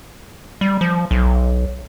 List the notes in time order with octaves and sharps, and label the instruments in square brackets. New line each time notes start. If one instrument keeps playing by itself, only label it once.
[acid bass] G3
F3
B1